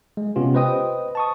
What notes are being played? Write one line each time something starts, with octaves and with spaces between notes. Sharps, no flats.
G#3
C3 B3 C#4 F4 G4
B4 C5 D#5 G5 D#6
A5 C#6 D#6